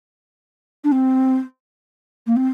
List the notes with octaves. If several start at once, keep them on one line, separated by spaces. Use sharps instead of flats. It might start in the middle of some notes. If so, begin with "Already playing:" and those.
D4
C4
A#3
C4